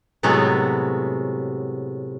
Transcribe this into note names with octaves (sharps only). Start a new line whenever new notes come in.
A2 C3 F#3 G#3 A3 B3